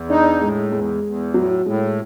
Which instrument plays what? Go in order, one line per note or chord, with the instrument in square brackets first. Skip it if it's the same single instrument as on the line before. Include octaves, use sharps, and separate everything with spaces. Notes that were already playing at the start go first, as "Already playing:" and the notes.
Already playing: [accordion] E2
[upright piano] D4 [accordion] D#4
[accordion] A2 [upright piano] G#3
[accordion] E2 [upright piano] G#3
[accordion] E2
[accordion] A2 [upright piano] F#3
[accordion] A2 [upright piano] G#3